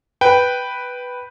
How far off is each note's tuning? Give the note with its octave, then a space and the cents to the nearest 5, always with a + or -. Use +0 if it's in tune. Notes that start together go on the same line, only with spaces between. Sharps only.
B4 +0 G5 -5